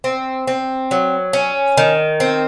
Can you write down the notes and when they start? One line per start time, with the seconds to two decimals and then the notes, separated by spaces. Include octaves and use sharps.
0.04 C4
0.47 C4
0.91 F#3
1.33 C#4
1.77 D#3
2.20 C4